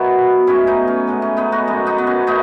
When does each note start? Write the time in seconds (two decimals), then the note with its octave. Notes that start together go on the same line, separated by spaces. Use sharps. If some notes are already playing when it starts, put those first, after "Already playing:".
Already playing: B2 D#3 F#3 B3 E4
0.47 A2 G#3 B3 C#4 E4
0.67 B3 D#4
0.87 C#4
1.07 A2 G#3 B3
1.22 C#4
1.37 B3 D#4
1.52 D#4 F#4
1.67 F#2 D#3 G#3
1.87 B3 D#4
1.98 B3
2.07 C#4
2.27 B2 A3 B3 D#4